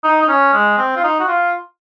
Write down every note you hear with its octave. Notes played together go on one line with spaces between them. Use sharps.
D#4
D#4
C#4
G#3
C4
F4
D#4
F#4
F4